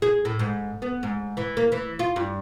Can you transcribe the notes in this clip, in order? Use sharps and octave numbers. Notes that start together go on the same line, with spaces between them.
G#4
A2
G#2
B3
G#2
E3
A#3
E3
F4
G2